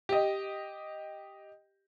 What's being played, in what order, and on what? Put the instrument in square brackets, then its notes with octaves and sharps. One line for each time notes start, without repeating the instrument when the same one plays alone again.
[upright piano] G4 D#5